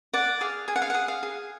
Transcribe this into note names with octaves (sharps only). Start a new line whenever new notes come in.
D5 F#5
G#4 F5
G#4 G#5
F#5
F5
G#4 F#5
F5
G#4